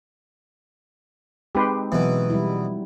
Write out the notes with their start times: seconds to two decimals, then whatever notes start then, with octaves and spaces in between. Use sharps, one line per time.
1.55 G#3 C4 D#4 G4 B4 C6
1.92 B2 E3 F#3 B3
2.30 G3 E4